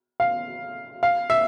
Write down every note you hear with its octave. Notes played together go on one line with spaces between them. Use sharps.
F5
F5
E5